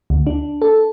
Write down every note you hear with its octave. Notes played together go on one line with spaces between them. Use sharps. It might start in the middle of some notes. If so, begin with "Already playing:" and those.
D2
D4
A4